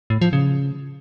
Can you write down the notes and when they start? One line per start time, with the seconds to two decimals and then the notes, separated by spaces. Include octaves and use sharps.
0.10 A2
0.21 F3
0.33 C#3